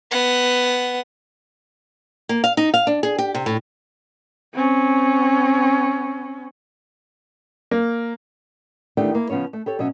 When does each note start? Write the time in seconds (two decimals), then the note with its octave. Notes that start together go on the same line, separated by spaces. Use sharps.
0.11 B3 F#5
2.29 A#3
2.44 F5
2.57 D#4
2.74 F5
2.87 D4
3.03 G#4
3.18 G4
3.35 C3
3.46 A2
4.54 C4 C#4
7.71 A#3
8.97 E2 D#3 A3 D4 G4 G5
9.15 A#3 E4 A#4
9.30 C#3 F3 B3 C#4 C#5
9.53 A3
9.66 G4 A4 C#5
9.79 B2 F#3 C#4 E5